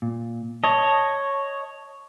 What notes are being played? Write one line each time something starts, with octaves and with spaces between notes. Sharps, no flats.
A#2
C#5 D#5 A5